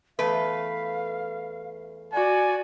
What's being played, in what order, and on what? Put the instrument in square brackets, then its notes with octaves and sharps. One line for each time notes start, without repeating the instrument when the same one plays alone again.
[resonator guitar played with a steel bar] E2 A3 B4 [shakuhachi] F5
[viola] F#4 [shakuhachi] D5 [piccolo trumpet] G#5